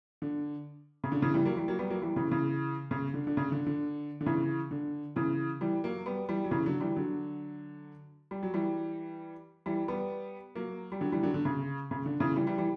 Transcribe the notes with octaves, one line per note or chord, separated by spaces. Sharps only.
D3
C#3
D3
C#3 E3
E3 G3
F#3 A#3
E3 G3
F#3 A#3
G3 B3
F#3 A#3
E3 G3
C#3 E3
C#3 E3
C#3
D3
D3
C#3
D3
D3
D3
C#3 E3
D3
C#3 E3
E3 G3
F#3 A#3
G3 B3
E3 G3
F#3
C#3 E3
D3 F#3
E3 G3
D3 F#3
G3
F#3
E3 G3
E3 G3
G3 B3
F#3 A#3
G3
D3 F#3
E3 G3
D3 F#3
D3
C#3
C#3
D3
C#3 E3
E3 G3
E3 G3
E3 G3